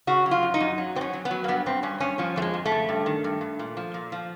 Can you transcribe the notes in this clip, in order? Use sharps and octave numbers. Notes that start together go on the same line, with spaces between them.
C#3 F#4
F#3
F4
F#2
D#4
F#2
F#3
F#2 C4
C#4
F#3
B3
F#3
A#3
G2 B3
G2 C4
G2 C#4
G2 C#4
F3 C#4
F2 A3
G#3
F2
A3
C#3
G2
D#3
G2
G2
A#2
F3
A#2
F3